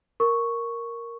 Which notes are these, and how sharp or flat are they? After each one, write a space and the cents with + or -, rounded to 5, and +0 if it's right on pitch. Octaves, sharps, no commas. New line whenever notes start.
A#4 +0 C#6 +0